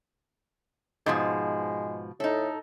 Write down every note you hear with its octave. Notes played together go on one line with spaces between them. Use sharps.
G#2 B2 F3 G#3
A2 D#4 A4